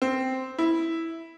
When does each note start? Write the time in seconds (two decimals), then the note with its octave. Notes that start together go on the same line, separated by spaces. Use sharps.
0.02 C4
0.59 E4